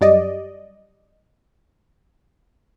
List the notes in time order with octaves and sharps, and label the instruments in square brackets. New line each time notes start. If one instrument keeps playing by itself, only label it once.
[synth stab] F#2 G3 D5 D#5